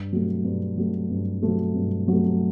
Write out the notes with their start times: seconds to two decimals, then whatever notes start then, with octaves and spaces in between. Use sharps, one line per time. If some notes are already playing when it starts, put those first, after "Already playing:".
Already playing: G2
0.13 F#3 A3
0.44 G2
0.77 F#3 A3
1.10 G2
1.42 F#3 A3
1.75 G2
2.08 F#3
2.13 A3